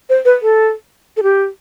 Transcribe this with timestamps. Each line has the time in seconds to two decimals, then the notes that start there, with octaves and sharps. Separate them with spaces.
0.09 C5
0.25 B4
0.42 A4
1.17 A4
1.23 G4